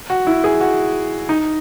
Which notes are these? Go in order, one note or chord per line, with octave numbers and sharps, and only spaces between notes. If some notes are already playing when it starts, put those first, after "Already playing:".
F#4
E4
G#4
F#4
D#4